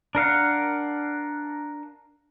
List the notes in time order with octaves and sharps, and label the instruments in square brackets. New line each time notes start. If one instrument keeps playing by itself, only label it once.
[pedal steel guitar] D4 A#4 F5 F#5